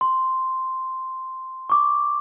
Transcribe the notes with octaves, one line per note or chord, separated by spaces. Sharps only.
C6
C#6 D6